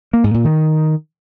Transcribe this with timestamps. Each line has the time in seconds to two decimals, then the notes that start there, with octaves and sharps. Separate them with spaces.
0.13 A#3
0.24 G#2
0.34 A#2
0.45 D#3